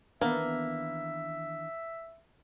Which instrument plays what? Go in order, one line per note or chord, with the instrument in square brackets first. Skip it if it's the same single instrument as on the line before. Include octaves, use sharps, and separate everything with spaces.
[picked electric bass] D#3 E3 D4 [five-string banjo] A#3 [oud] B3 [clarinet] E5